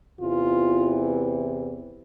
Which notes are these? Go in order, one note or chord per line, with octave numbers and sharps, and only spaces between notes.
E2 C3 E3 F4